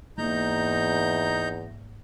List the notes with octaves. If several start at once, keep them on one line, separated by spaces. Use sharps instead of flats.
E2 G#2 A#3 D#4 A#5 G6